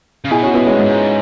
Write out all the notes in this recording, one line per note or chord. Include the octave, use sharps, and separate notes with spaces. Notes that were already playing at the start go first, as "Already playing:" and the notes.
C#3
B2 E4 G#4
C#4 F#4
B3 E4
G#3 C#4
G#2